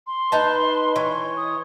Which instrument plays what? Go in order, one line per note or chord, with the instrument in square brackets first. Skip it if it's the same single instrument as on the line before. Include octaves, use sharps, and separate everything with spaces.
[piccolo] C6
[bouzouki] D#4 A5 [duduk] B4
[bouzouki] E3 [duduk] C#5
[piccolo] D#6